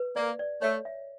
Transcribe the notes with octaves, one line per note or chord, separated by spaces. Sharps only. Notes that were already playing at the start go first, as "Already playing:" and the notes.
Already playing: B4
A#3 D5
D5
A3 C#5
E5